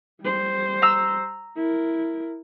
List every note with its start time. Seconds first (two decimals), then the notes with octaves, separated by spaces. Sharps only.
0.21 G3 C5
0.82 A#5 E6
1.56 E4 A#4